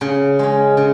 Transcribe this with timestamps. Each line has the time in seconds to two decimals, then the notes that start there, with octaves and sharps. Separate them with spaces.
0.01 C#3
0.39 G#3 C#4
0.77 C#3